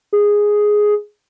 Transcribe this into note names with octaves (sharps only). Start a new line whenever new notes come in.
G#4